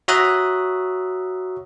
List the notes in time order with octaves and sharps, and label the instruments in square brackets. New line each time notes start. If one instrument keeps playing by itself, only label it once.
[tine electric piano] F#4 C#5 E5 A#5 D#6 F#6